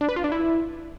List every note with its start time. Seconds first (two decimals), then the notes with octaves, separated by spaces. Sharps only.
0.01 D4
0.09 B4
0.16 F4
0.24 D4
0.32 E4